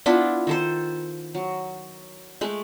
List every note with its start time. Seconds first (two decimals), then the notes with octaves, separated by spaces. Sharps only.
0.06 B3 D4 E4 F4
0.47 D#3 A4 C5
1.35 F#3
2.41 G#3 A3